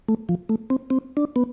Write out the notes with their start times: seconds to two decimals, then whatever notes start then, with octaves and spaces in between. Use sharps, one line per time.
0.08 A3
0.29 F3
0.49 A3
0.70 C4
0.90 C4
1.17 D4
1.36 B3